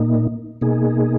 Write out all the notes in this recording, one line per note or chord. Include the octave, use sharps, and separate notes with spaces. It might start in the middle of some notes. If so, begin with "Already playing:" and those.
Already playing: A#2 A#3 D#4
B2 A#3 D#4 G#4